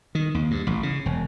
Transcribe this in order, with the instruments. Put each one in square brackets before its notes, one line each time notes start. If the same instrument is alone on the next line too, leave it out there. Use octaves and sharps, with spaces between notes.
[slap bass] D#3
D#2
G2
A1
C#3
E1